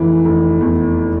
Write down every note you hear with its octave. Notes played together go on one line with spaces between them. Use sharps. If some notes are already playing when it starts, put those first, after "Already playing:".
Already playing: F1 E3
F1
E2